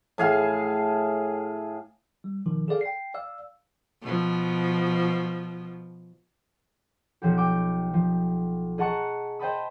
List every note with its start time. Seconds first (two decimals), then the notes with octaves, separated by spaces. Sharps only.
0.18 A2 G#4 F5 A5
2.24 G3
2.46 B2 D#3 F3
2.68 G#4 A4 D5 F5
2.81 G5 C7
3.14 D5 F5 E6
4.02 B2 F3
7.22 B1 F3 F#4 G4
7.37 G5 D6
7.93 F3
8.78 G#4 D#5 F#5 A5 A#5 C#6
9.39 C5 D#5 G5 A5 B5 D#6